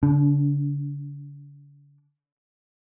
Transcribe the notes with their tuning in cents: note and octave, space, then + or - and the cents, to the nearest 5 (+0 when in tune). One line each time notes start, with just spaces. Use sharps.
D3 -45 D4 -15